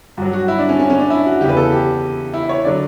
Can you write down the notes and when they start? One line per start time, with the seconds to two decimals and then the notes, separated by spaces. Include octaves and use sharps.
0.17 G2 F#4
0.22 F#3
0.33 F#4
0.48 E4
0.59 D4
0.69 C#4
0.79 C#4
0.90 C#4
1.00 D4
1.10 E4
1.26 F#4
1.41 E2 C#3 E3 G4
1.49 B4
1.57 A4
1.72 G4
2.34 E4
2.49 C#5
2.65 D3 F#3 D5